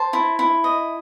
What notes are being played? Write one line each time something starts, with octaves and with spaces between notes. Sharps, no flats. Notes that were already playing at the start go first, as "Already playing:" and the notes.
Already playing: C5 A5
E4
E4
D#5